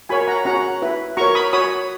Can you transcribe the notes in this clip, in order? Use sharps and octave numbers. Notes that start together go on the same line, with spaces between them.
F#4 A#4 C#5 G#5 B5
F#5 A#5
C#4 F#4 C#5 F#5 A#5
E4 B4
F#4 A#4 C#5 A#5 C#6
B5 D#6
F#4 C#5 B5 D#6